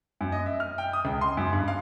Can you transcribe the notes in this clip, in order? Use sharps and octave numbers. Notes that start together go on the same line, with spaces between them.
F#2
D#5
E5
F6
G5
D#6
C#2
C6
F#2
G2
F5